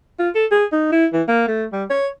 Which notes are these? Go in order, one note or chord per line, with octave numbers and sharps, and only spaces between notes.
F4
A4
G#4
D#4
E4
E3
A#3
A3
G3
C#5